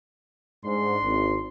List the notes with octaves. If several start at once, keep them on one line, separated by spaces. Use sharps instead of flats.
G#2 D4 C6
G#1